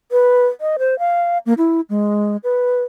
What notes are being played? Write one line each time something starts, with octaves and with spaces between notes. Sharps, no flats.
B4
D#5
C5
F5
A#3
E4
G#3
B4